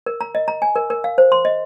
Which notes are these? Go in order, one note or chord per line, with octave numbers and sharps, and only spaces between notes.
A#4
A#5
D#5
A#5
G#5
A#4
A#4
F5
C5
C6
D#5